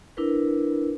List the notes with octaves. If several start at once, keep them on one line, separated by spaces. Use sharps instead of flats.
D4 E4 A#4 B4